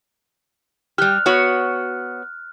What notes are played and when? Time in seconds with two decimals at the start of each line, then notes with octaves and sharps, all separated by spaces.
0.98 G3 G4 F6 F#6
1.26 B3 F#4 C#5